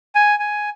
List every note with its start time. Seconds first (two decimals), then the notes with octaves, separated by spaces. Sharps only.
0.15 G#5
0.39 G#5